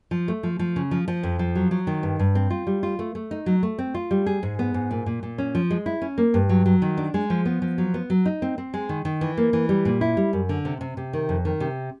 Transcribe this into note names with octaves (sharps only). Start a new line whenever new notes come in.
F3
A3
F3
F3
C#3
F3
F3
F2
F3
F#3
F#3
D#3
G2
G2
C4
F4
G3
F4
A3
A3
D#4
F#3
A3
C4
F4
G3
G#4
G#2
B3
G#2
A#2
A#2
A#2
C#4
F3
G#3
E4
C#4
A#3
G2
F#3
F#3
D#3
D4
G#3
F3
B3
F3
F#3
B3
F#3
D#4
C4
C4
G#3
D#3
D#3
E3
A#3
E3
G3
A#2
E4
G3
F#2
D3
C3
C3
C3
D#3
F2
D#3
C3